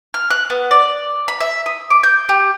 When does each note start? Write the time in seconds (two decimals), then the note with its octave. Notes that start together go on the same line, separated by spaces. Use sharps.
0.14 F6
0.31 F#6
0.50 B3
0.71 D5
1.28 B5
1.40 E5
1.66 D#6
1.90 D6
2.03 G6
2.29 G4